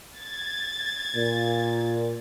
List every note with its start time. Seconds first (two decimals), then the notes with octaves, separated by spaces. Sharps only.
0.18 G#6 A6
1.15 A#2